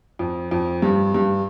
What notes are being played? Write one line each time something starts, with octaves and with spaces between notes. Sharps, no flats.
F2
F2
G2
G2